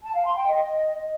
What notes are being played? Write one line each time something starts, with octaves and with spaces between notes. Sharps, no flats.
A5
F5
C6
G5
D#5